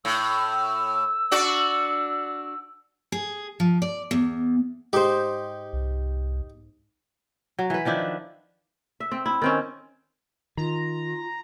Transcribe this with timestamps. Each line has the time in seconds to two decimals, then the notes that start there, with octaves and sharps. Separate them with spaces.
0.05 A2 E6
1.31 D4 F#4 D5
3.12 G#4
3.60 F3
3.82 D5
4.11 E2
4.93 G#2 D#4 G4 C5
5.73 C2
7.59 F#3
7.70 E3 B4
7.85 D#3 F3 D4 E4
9.00 E5
9.12 C4
9.26 E4
9.42 D#3 C4 C#4
10.57 D#3 F4 A#5